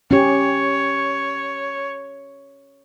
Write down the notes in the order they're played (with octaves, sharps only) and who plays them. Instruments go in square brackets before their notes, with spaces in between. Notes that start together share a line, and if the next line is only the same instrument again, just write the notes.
[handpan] C#4 G4 [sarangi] C#5